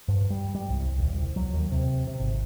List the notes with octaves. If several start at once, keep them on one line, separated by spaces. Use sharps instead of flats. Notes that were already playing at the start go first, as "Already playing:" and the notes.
G2
G3
G3
C2
D#1
C2
F#3
D#2
C3
C3
G#1